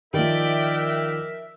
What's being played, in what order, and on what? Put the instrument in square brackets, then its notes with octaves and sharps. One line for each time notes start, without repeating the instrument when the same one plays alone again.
[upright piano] D#3 F3 [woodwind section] A#4 E5 [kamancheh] D5 G5